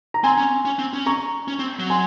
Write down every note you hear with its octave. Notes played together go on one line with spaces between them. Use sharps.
A#5
C4 G#5 C6
C#4
C#4
C4
C#4
A#5 C#6
C#4
C4
F#3
G#5 C6